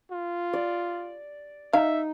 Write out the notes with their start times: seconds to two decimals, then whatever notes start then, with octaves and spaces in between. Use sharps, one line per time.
0.11 F4
0.53 D5
1.73 D#4 E5 F5